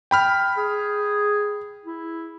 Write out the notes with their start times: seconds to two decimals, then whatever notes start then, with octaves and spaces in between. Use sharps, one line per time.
0.11 G5 B5 F6
0.57 G#4
1.85 E4